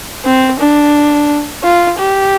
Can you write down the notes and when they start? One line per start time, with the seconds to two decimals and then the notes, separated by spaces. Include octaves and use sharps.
0.25 C4
0.59 D4
1.63 F4
1.98 G4